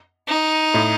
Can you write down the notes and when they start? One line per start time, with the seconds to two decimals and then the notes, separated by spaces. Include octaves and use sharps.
0.29 D#4
0.74 A2